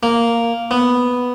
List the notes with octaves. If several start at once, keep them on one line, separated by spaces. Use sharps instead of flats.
A#3
B3